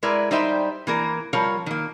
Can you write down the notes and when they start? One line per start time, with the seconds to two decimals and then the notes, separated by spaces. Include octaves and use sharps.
0.03 G#3 E4 A#4 B4 D5
0.31 G3 D#4 C5 E5 G5
0.87 E3 A#3 A#4
1.33 F3 G3 A#4 C#5 F5
1.66 D#3 A#3